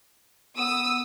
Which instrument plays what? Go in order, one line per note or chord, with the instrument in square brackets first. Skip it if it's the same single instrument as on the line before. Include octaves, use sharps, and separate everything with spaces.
[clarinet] B3 [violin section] D#6 E6